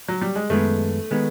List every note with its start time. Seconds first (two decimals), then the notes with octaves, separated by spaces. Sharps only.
0.08 F#3
0.22 G3
0.36 G#3
0.50 F#2 D#3 G#3 A3 B3
1.11 D#3 G#3 B3